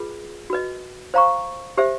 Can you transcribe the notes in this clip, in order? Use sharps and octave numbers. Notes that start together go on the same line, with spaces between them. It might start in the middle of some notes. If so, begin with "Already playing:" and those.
Already playing: F4 G#4 B4
F#4 B4 D#5
C5 F5 A#5 C#6
G4 C5 E5